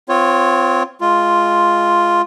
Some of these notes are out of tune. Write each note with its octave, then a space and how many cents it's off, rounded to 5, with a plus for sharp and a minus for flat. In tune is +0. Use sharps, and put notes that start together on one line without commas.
C4 -25 F4 +0 C#5 -5
G#3 +20 F4 +0